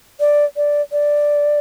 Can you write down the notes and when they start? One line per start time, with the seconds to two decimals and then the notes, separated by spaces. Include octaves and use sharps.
0.20 D5
0.56 D5
0.92 D5